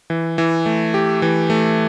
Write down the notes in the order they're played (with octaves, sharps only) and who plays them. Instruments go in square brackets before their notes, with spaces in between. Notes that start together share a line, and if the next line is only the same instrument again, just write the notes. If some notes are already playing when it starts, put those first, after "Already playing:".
[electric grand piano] E3
E3
A3
G4
E3
A3